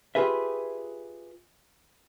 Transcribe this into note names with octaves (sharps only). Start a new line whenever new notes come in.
F4 G4 G#4 B4 E5